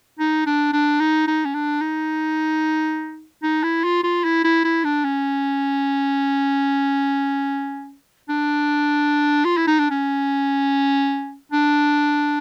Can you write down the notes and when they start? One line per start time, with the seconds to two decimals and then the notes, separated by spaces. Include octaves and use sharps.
0.19 D#4
0.46 D4
0.73 D4
1.00 D#4
1.28 D#4
1.45 C#4
1.54 D4
1.81 D#4
3.43 D#4
3.63 E4
3.84 F4
4.04 F4
4.24 E4
4.44 E4
4.64 E4
4.84 D4
5.04 C#4
8.29 D4
9.45 F4
9.57 E4
9.67 D#4
9.79 D4
9.91 C#4
11.52 D4